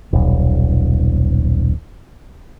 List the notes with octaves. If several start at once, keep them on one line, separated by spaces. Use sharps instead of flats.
D#1 B1